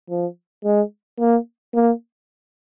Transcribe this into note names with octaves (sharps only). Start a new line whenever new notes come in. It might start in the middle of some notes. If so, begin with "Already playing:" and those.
F3
G#3
A#3
A#3